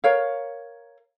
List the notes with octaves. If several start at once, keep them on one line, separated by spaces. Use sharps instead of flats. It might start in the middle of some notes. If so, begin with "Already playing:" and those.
A#4 C#5 F5